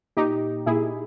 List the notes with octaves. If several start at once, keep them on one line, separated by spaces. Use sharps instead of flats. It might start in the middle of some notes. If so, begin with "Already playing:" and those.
A#2 D#4 G4
A#2 E4 G#4